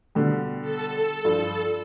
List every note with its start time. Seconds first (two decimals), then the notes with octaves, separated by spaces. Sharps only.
0.15 B2 D3 G3
0.62 A4
1.25 G2 F3